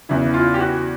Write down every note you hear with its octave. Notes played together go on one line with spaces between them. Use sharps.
E2 C#3 E3 E4
F4
G4
F#4